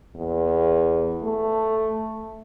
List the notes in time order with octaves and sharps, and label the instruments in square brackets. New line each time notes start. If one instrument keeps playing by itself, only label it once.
[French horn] E2
A3